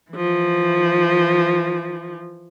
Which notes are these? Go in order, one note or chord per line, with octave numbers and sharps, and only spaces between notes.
E3 F3